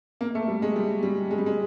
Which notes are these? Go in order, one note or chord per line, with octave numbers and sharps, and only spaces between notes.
A#3
A3
G3
G#3
G3
G3
G#3
G3
G#3